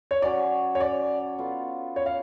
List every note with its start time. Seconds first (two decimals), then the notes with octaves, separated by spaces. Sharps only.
0.11 C#5
0.22 F#3 C#4 F#4 D5
0.75 C#5
0.80 D5
1.39 B3 F4 A4
1.96 C#5
2.06 F5